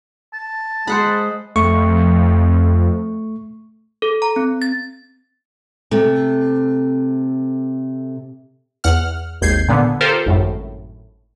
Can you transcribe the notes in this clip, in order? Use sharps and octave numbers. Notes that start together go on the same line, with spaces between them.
A5
G#3 G#4 C5 F#5 B5
F2 A3 C#6
A4
A#5
C4
A6
C3 A3
E2 F#5 F6
G#1 D#2 G6 G#6 C7
A#2 D3 B3
F4 G4 A4 A#4 C5
G#1 F#2 A2